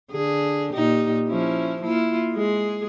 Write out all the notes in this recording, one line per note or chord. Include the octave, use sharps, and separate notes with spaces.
D3 G#4
A#2 D#4 G4
F3 C#4 E4
A#3 E4 F4
G#3 G#4